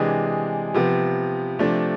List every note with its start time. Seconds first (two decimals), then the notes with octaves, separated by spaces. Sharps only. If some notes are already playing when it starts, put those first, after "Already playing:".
Already playing: C3 E3 G#3 D4 G#4
0.74 C3 F3 B3
1.59 C3 F3 A3 D4